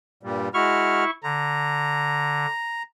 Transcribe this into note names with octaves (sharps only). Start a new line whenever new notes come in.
G2 A#2 G3
G#3 E4 F#4 C#6 F6
D3 A#5